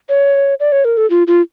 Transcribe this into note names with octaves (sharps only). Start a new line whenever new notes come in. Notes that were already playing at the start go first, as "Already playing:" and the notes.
C#5
D5
C#5
A#4
A4
F4
F4